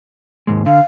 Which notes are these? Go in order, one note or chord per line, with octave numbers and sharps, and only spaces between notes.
D#2 G#2 G#3
D3 F5